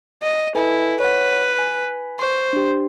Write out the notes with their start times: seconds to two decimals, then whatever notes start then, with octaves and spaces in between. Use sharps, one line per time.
0.22 D#5
0.55 E4 A4 B4 G#5
1.00 B4 C#5 F#5
1.59 G#5
2.19 C5 C6 C#6
2.53 D4 G4